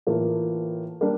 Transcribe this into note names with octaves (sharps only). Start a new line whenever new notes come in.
A2 E3 A#3 F4
G3 A#3 D4